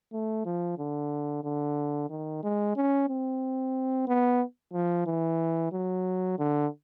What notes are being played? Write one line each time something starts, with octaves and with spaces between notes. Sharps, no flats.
A3
F3
D3
D3
D#3
G#3
C#4
C4
B3
F3
E3
F#3
D3